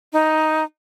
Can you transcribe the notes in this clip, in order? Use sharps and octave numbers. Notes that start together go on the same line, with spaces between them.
D#4